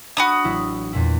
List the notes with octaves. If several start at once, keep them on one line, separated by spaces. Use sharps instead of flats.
D4 F#4 B5 D#6
A1 F#3 E4
E2 A#2 E4